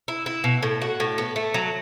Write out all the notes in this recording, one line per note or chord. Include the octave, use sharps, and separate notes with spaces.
E4
E4
B2
A2
F#4
A2
B3
A3
F#3